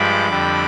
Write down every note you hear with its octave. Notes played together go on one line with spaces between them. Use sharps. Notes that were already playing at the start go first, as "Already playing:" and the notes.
Already playing: G2 F3 G#3 B5 D6
F2 D3 G3